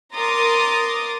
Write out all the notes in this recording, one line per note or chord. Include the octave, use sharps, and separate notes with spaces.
A#4 A#5 C6 D6 D#6 A6